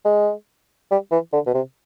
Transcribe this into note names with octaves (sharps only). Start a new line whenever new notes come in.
G#3
G3
E3
D3
B2
C3